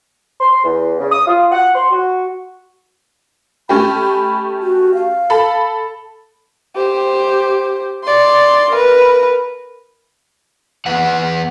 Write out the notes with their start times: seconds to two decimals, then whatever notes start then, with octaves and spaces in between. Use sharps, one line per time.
0.41 C6
0.64 E2
0.99 C#3
1.11 D#6
1.27 F4
1.51 F#5
1.75 C6
1.91 F#4
3.69 A3 C#4 G4 B5
4.62 F#4
4.94 F5
5.30 A4 B5
6.75 G4 C5
8.03 D5 C6
8.72 A#4 B4
10.86 E2 B4 F#5